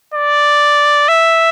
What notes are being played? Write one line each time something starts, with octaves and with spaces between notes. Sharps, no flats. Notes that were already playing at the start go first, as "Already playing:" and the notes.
D5
E5